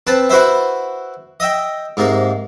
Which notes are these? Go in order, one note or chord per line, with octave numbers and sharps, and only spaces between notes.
C4 B4 A5
E4 F#4 B4 C5 E5
D#5 E5 G5
G#2 C3 A#3